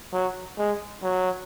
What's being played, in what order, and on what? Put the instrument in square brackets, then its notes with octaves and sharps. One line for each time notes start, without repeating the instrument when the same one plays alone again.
[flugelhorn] F#3
G#3
F#3